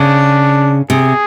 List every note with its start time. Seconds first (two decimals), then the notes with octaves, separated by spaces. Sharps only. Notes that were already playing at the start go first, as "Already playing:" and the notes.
Already playing: C#3 D4
0.90 C3 G#4